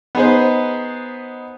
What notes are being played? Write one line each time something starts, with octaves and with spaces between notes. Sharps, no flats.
B3 D#4 G#4 B4 C5